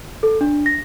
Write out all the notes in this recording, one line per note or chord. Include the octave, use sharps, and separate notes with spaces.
A4
D4
A#6